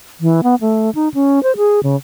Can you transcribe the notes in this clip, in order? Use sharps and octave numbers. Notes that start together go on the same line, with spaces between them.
E3
B3
A3
D#4
C#4
C5
G#4
C#3